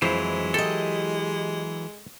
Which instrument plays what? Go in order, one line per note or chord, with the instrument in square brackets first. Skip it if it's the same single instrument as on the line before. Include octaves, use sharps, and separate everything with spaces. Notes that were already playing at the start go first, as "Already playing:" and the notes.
[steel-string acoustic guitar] F2 [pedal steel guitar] E3 F#3 E4 [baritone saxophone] G#3 [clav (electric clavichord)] C5
[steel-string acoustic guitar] G4 D#5 [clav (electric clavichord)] A4